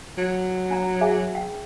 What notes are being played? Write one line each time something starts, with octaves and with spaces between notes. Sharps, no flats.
F#3
D4 A#5
G#4 E5 G#5
G5